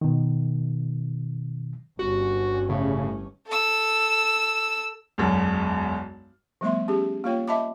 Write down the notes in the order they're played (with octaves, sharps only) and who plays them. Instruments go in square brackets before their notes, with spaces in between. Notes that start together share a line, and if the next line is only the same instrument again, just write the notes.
[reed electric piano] B2 D#3
[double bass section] G1 G2 C#4 [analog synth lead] F#4
[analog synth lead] A2 [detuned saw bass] C#3
[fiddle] A4 E6
[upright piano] E1 B1 F#2
[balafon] F3 G3 A3 B3 E5 C6
C#4 G4 G#4
A#3 F4 C#5 G5
D#5 E5 A5 B5 D6